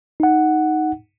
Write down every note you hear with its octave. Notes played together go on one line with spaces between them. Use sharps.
D#4 F#5